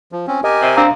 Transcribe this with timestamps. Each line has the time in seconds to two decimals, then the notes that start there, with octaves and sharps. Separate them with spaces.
0.12 F3
0.27 C4 C#4
0.44 G4 A#4 D#5 G#5
0.62 C3
0.77 C4 D4 F5 A#5